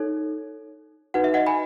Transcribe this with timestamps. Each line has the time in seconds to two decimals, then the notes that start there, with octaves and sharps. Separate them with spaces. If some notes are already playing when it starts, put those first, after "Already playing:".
Already playing: D#4 A4 C#5
1.14 D#4 F#4 B4 F#5
1.24 E5
1.34 D#5 F#5
1.47 G#5 B5